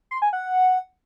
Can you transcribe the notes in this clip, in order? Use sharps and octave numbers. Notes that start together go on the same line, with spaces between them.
C6
G#5
F#5